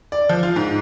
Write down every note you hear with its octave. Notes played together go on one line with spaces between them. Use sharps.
D5
F3
F4
G#2